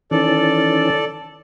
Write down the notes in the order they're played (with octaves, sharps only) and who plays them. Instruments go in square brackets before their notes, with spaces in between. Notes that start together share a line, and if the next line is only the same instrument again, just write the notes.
[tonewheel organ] D#3 E3 C#4 [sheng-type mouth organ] A4 D5